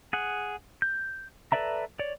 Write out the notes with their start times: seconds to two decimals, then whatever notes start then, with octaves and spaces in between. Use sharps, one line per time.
0.13 G#4 F#5
0.82 G6
1.52 A4 B4 D5 E5 A#5
1.99 C#5 D5